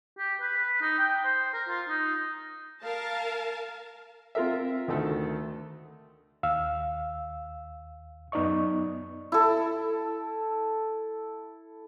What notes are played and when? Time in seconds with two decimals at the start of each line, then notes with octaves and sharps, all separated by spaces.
0.18 G4
0.41 B4
0.57 B4
0.81 D#4
0.99 G5
1.25 C5
1.54 A#4
1.69 F4
1.89 D#4
2.84 A#4 F5 A5
4.35 C4 F4 A#4 E5
4.88 D2 D#3 A3 A4
6.43 D#2 F5 E6
8.32 F#2 B3 D#4 D5 D#5 C#6
9.32 E4 A4